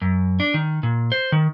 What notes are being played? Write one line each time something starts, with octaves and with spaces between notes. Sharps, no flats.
F#2
D4
D#3
A#2
C5
D#3